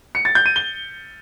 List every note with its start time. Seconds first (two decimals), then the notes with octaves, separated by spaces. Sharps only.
0.15 C#7
0.25 A6
0.35 G6
0.46 D#7
0.56 G7